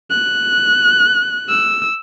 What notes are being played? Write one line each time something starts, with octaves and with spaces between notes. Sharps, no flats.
F#6
E6